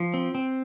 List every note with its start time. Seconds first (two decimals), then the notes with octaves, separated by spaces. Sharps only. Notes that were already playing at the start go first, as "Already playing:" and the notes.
Already playing: F3
0.14 C4
0.35 C4